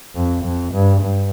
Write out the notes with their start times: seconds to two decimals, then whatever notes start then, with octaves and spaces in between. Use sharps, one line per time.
0.15 F2
0.44 F2
0.72 G2
1.01 G2